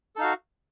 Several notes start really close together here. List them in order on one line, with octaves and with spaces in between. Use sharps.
A4 D#4 F5 F#4